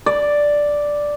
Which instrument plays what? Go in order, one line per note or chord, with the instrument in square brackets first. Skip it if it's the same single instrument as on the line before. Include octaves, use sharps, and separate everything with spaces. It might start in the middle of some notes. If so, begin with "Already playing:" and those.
[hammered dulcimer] D5